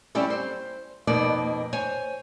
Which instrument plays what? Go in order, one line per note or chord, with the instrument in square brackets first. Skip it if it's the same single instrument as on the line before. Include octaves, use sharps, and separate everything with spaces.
[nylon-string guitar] G3 C4 C#4 E4 G4 A4
C5
F2 B2 A#3 D#4 B4 D5
C5 C#5 G#5